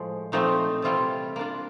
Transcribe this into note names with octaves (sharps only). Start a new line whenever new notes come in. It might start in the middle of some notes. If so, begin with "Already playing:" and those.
Already playing: A2 F3 G#3
A#2 F3 A3 C4 D#4
C3 E3 G3 C4 F4
A#3 D4 F4